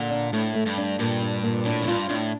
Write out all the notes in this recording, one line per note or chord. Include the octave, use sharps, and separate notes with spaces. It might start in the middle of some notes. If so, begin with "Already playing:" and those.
Already playing: A#2 D3
D4
A2 A3
A3
G2
D4
G2 A#2
D4
A#2
A2 D4
F2
G2 F4
A2 D4